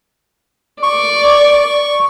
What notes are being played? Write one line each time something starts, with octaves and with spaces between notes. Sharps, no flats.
D5 C#6